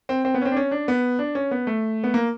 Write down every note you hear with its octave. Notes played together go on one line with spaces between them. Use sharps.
C4
C4
B3
C#4
C4
D4
C#4
D4
B3
D4
C#4
B3
A3
B3
A#3